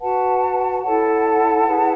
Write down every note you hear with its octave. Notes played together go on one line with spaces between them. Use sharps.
F#4 B4 F#5 A5
E4 A4 C#5 F#5 A5
E4 G#4 B4